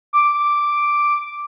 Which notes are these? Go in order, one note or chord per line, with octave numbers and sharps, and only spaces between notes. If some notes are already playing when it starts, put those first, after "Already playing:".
D6